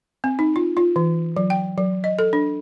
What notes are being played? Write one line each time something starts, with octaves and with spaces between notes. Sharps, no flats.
C4
D#4
F4
F4
E3
F#3
G5
F#3
D#5
A4
D4